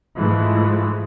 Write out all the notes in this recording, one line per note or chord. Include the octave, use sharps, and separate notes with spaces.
G#2 E3 F3 G#3 A3